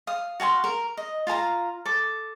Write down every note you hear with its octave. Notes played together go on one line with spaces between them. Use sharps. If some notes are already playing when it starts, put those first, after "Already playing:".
F5 D#6
F#4 F5 G#5 C6
A#4
D#5
F4 F5 A5 A#5
A4 D6